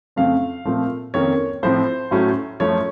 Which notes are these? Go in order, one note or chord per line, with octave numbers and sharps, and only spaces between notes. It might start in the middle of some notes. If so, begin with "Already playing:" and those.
F2 C#3 A3 C4 F5
A#2 F3 A3 C4
F2 D#3 A#3 C#4 C#5
A2 F3 C4 C5
A2 F#3 A3 C#4
F#2 F3 A3 C#4 C#5